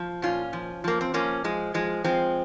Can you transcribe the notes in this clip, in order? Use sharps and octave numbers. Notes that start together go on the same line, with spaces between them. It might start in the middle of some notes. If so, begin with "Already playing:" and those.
Already playing: F3
A#2 C#4 F4
F3
F3 A#3
C4
F3 A#3 C#4
F3 G#3
F3 G#3
F3 G#3 C4